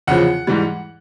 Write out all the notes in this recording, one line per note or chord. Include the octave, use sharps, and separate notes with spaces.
E2 C#3 F3 F#5
G#2 E3 G3